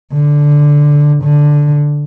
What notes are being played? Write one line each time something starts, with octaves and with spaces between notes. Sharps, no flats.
D3
D3